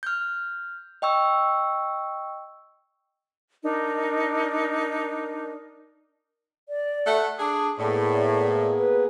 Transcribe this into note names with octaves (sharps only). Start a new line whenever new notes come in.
F6 G6
D#5 G5 C#6 E6
D4 D#4 A#4
D5
A3 F#5
D4 G#4 D#6
A2 A#3 B3 G#4 D5
B4